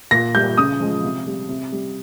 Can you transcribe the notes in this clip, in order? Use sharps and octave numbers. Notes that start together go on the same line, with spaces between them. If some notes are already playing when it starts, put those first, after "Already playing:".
A#2 A#6
G3 G6
C#3 D#6
F3 G#3
C3
G3
C3
G3